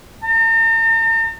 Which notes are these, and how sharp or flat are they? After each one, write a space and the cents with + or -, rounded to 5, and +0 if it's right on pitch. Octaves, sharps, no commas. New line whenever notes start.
A#5 -45